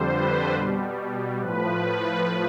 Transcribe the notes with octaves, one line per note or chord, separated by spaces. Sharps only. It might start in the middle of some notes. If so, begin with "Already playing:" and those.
Already playing: F2 D3 G3 C5
B4
B2 G3
A2 F3 B4